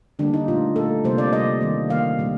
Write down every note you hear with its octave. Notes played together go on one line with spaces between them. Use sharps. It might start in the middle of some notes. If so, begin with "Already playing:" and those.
D3 G3 A#3 D4
D#4
A#2 A3 F4
A#2 A3 A4
C3 G3 A#3 C5
D5
C3 G3 A#3 D#5
D#3 G3 A#3
D#3 G3 A#3 F5
A#2 G3 A#3